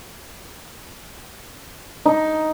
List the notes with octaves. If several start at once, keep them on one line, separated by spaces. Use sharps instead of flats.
D#4